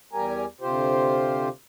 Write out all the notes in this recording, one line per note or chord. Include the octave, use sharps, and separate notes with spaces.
E2 G3 G4 A#4 G#5 A#5
D2 C3 F4 G4 C5